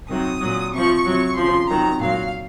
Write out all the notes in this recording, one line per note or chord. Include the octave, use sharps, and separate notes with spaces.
C3 D#3 F#3 D#6
A#2 F#3
C3 F3 C#6
C3 F#3
C#3 F3 C6
C3 D#3 F#3 A#5
A#2 F#3 F5